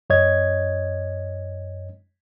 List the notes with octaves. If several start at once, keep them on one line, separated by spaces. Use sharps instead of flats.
F#2 C#5 D#5 G#6